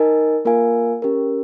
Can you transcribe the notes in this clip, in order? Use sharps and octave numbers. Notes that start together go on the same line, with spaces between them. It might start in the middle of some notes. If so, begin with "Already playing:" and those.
Already playing: D#4 A#4 D#5 G#5
A#3 F4 A#4 F5 G#5
C#4 G4 A#4